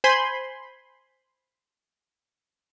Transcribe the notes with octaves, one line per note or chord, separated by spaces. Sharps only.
C5 G#5 B5 C6